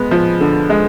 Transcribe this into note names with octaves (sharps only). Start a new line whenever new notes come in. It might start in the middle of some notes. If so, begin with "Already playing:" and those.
Already playing: G#3 B3
F3
D3
G#3